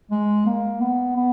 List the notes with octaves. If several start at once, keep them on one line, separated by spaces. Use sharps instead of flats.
G#3
A#3
B3
B3